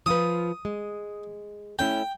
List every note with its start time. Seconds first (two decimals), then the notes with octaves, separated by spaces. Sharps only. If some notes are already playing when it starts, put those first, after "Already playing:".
0.06 F3 F4 B4 D#6
0.65 G#3
1.79 A3 C#4 E4 G5